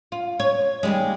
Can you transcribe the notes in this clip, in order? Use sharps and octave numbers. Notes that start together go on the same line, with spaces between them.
F4
C#5
D#2 G3 G#3